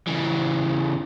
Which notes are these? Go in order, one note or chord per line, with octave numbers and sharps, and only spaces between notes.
C#3 E3